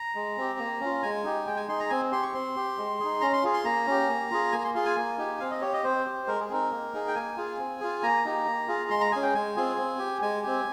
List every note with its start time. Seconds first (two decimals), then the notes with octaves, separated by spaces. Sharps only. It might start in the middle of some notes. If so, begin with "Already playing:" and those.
Already playing: A#5
0.15 G#3
0.37 C4 G4
0.59 A#3
0.80 C#4 F4
1.03 G#3 G#5
1.24 D#4 G4
1.46 G#3 G5
1.57 G#5
1.68 D#4 G#4 C6
1.80 A#5
1.90 C4 G#5
2.12 G4 C6
2.23 C#6
2.34 C4 C6
2.56 G4
2.78 G#3
3.00 D#4 G#4
3.21 C#4 A#5
3.33 C6
3.43 F4 G#4
3.54 C6
3.65 A#3 A#5
3.87 C#4 G4
4.09 A#3
4.31 F4 G#4
4.52 A#3 G#5
4.58 A#5
4.64 C6
4.75 F4 G#4 C6
4.86 G#5
4.97 A#3
5.18 D#4 G4
5.40 C4 F5
5.51 D#5
5.61 G4 C#5
5.73 D#5
5.84 C4 C5
6.06 G4
6.27 G#3 A#4
6.40 G#4
6.50 C4 D#4 A#4
6.71 A#3
6.93 D#4 G#4
7.08 G5
7.15 A#3 G#5
7.37 F4 G#4
7.59 C4
7.80 F4 G#4
8.03 A#3 A#5
8.25 D#4 G4
8.46 A#3
8.68 F4 G#4
8.90 G#3 C6
9.01 A#5
9.12 C#4 G#4 G#5
9.23 G5
9.34 G#3 G#5
9.56 C4 F4 G#4
9.77 C4
9.99 G4
10.22 G#3 G#5
10.43 C4 G4